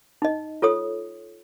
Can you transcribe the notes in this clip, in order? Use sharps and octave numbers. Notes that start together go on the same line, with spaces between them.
D#4 D#5
F4 A4 C#5 D#6